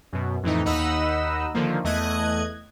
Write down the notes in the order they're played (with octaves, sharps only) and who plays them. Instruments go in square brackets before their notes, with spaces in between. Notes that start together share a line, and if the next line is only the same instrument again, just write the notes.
[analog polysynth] F#2 B2
F2 A2 E3 D#4
D#2 D#4 D#5 F#5 B5 E6
D3 D#3 F3 A#3
E2 A3 D#5 D#6 F#6 G#6